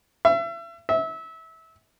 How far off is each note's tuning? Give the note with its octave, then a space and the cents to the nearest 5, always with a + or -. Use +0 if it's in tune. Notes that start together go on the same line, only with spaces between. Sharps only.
E5 +35
E5 -25